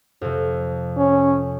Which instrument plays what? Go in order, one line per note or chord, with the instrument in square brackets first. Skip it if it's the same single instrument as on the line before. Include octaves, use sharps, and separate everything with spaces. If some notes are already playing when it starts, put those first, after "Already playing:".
[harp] F2 C3
[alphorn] C#4